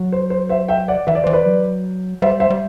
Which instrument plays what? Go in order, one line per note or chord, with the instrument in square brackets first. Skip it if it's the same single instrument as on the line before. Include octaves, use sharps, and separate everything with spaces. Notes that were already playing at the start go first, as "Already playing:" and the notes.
Already playing: [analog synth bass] F#3
[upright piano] C5
C5
C5 E5
E5 G5
D5 F#5
[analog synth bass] E3 [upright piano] E5
[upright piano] D5
[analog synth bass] E3 [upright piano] C5
[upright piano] B4 D5
[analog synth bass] F#3
[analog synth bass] G3 [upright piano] C5 E5
[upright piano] C5 E5
[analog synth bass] G3